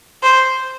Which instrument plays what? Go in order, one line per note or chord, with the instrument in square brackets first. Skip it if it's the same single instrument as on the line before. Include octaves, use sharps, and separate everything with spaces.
[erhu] C5